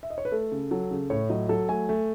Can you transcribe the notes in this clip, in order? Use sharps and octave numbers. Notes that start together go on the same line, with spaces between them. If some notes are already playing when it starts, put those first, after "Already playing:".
E5
D#5
C#5
B4
A3 A4
C#3
F#3 A4
C#3
A2 C#5
F#3 D#5
F#3 A4
A3 G#5
A3